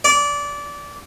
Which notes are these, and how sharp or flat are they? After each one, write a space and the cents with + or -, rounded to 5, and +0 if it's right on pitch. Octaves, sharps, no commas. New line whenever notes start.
D5 -20